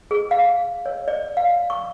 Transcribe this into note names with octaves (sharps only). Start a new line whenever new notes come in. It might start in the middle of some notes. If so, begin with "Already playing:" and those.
G#4
F5
C#5
D5
F5
C#6